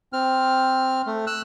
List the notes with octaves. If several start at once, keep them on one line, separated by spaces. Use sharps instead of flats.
C4 F6
A3
E6 F#6